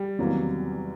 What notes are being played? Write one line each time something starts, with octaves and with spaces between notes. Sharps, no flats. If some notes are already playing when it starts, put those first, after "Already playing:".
Already playing: G3
E2 C3 D#3 F#3 A#3